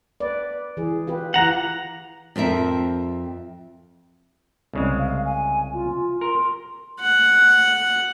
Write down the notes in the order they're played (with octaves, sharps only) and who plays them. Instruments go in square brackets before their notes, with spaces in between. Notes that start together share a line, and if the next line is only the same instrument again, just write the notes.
[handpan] B4 D5
E3 G#4
F4 G4 B4
[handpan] E3 F4 [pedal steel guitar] F#5 A#5
[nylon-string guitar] F2 C4 A#4 E5
[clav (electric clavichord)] C2 C#3 G#3
[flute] F5
G#5
F4
[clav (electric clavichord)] A#4 [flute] C6
[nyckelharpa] F#5